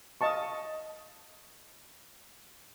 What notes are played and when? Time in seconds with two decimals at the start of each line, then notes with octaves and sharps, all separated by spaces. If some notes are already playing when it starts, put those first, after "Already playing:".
0.21 D#5 F5 A5 C#6